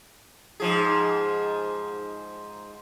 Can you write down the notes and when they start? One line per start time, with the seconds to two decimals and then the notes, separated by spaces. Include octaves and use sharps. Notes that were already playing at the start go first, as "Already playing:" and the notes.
0.60 G#2 F3 G#4